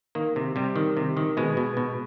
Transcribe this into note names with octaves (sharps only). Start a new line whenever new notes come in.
D#3 A#3
C3
C3 G3
D#3
C3
D#3
B2 G#3
B2
B2